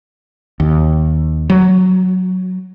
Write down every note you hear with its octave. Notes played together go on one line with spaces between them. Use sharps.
D#2
F#3